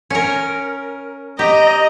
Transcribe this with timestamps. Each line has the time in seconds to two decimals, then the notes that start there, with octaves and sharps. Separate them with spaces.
0.10 C#4 A#4
1.39 G4 D#5 A#5